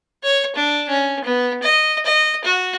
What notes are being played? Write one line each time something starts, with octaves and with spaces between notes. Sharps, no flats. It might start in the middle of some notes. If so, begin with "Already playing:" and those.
C#5
D4
C#4
B3
D#5
D#5
F#4